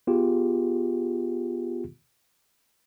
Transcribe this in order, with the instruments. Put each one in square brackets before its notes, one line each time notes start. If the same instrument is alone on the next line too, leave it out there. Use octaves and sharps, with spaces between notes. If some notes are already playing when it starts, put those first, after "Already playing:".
[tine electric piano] B3 F4 G4 G#4